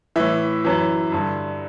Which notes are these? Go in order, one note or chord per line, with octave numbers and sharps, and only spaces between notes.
A2 E3 E5
F#2 E3
G2 D3